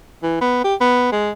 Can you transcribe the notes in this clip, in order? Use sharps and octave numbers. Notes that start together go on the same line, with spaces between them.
E3
B3
G4
B3
G#3